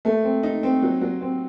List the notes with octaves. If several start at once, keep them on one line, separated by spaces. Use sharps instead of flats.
A3
C4
D#4
C4
F#3
F#3
C4